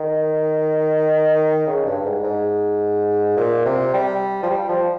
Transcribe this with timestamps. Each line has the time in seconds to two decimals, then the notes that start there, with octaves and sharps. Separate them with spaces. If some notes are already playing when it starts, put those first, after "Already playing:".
Already playing: D#3
1.67 C#3
1.86 G2
2.05 G#2
2.24 G#2
3.37 A#2
3.66 C3
3.94 G3
4.43 F3
4.50 G3
4.69 F3